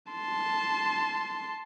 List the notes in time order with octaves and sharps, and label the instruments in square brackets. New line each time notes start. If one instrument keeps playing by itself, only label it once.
[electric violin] A5 C6